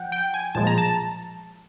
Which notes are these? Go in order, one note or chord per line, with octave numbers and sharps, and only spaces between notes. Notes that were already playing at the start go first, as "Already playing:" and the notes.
Already playing: F3 F#5 G5
G5
G#5
B1 A#2 F3 G#3 A5
A#5
A5